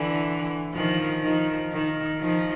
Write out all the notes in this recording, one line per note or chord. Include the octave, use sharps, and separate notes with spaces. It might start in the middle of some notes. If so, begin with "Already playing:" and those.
Already playing: D3 E3
D#3 F3
D#3 F3
D#3
D#3 F3